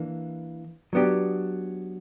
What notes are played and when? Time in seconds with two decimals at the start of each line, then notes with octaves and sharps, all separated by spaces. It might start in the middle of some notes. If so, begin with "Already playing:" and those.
Already playing: E3 A#3 D4
0.93 F#3 B3 D4 G4